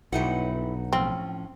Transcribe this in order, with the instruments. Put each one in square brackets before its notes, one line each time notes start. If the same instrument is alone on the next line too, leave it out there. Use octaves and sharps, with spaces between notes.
[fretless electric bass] B1 [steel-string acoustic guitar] G2 D#4 F#5 [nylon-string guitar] E4 E5 G5
[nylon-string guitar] A2 F3 C#4 [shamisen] C4